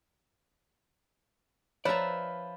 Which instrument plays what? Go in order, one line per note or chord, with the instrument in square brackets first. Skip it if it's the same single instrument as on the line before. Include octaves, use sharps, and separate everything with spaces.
[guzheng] F3 [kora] B4 E5 [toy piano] C#5 [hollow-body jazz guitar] D5 A#5